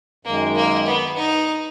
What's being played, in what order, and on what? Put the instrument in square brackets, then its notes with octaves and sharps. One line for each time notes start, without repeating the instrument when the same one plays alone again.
[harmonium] F#2 D#3 G#3 [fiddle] A#3
[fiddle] A#3
B3
D#4